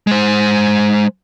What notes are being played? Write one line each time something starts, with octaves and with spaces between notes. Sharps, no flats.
G#3 C5